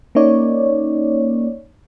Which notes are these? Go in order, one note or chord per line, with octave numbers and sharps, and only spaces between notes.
A#3 C#4 D#4 C#5 D5